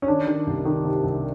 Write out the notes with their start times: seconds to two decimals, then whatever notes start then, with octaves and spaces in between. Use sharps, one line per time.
0.02 C#4
0.07 D#3 D4
0.27 D#3
0.47 C2
0.65 D#3
0.85 C3
1.04 C2